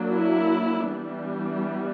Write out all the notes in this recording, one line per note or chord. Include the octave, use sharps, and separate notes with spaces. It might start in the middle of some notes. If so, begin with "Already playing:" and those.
Already playing: F#3 A#3 D4
E4
E3 G3 B3 D4